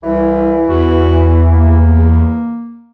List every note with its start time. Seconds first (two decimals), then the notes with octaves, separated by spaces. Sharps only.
0.03 C2 E3
0.69 E2 F#4
1.51 A#3